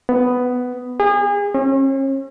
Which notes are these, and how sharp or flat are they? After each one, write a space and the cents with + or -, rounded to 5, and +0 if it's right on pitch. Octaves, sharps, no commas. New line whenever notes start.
B3 +10
G#4 -35
C#4 -40